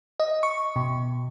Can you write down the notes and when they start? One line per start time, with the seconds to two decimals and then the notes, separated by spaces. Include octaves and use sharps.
0.20 D#5
0.43 C#6
0.76 B2